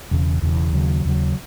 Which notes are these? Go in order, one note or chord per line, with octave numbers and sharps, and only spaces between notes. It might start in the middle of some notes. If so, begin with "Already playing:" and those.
E1 E2 C#3
E1 E2 C#3
D#2 C#3 F#3
D#2 C#3 F#3